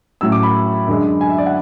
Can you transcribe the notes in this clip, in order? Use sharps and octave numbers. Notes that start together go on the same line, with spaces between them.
A2 F#3 C#4 E6
D6
B5
F#2 D3 G#3
G#5
E5
D5
F#5